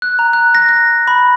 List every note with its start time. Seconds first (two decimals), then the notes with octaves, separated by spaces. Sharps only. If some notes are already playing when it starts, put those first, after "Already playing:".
0.02 F#6
0.19 A#5
0.33 F#6
0.55 A#6
0.69 A#6
1.08 B5